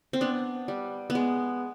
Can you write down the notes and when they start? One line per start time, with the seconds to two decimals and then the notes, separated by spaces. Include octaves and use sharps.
0.13 C4
0.21 B3 D4
0.68 G3
1.10 B3
1.15 G#3